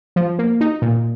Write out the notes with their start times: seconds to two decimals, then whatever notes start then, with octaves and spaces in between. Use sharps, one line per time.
0.16 F3
0.39 A#3
0.61 D#4
0.82 A#2